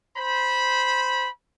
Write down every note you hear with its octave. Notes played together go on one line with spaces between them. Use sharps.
C5 B5